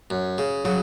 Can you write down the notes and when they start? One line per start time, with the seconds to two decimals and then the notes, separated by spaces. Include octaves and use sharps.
0.10 F#2
0.38 C#3
0.65 C#3 F#3 F#4